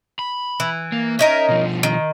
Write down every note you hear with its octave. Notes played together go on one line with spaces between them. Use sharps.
B5
E3
A#3
C#4 D#4 A#4 E5
B2 F3
D#3